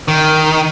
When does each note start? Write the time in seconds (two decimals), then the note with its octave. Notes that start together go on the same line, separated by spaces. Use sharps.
0.08 D#3